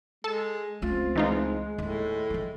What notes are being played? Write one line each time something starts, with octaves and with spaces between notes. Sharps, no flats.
G#3 A4
C#2 A3 C4 F4
E3 G#3 D#4 F4
D#2 A2
D#3 E3